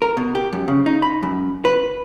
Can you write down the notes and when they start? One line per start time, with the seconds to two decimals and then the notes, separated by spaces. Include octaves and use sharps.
0.02 A#4
0.17 B2
0.35 G4
0.53 F#2
0.68 C#3
0.86 D#4
1.02 B5
1.23 F#2
1.65 B4